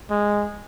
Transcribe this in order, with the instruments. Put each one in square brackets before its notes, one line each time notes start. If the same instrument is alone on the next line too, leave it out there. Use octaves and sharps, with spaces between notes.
[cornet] G#3